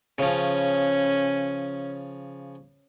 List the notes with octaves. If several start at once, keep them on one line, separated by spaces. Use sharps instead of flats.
C#3 F3 C#4